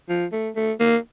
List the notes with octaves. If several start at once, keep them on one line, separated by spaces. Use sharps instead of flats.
F3
A3
A3
A#3